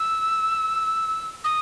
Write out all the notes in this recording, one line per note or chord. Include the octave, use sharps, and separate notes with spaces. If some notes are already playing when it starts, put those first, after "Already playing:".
Already playing: E6
D#6